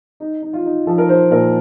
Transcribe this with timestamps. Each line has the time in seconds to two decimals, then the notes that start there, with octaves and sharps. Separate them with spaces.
0.20 D#4
0.42 D#4
0.53 F4
0.65 D#4
0.87 F3 A4
0.98 A#4
1.09 F3 C5
1.31 A#2 A#4